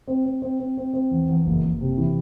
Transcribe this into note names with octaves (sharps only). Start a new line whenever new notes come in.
C4
C4
C4
C4
C4
C4
E2
E2
F#1
F#1
C3
E3